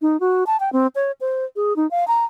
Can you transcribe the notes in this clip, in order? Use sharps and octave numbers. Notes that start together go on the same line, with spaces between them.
D#4
F#4
A5
G5
C4
C#5
C5
G#4
D#4
F5
A#5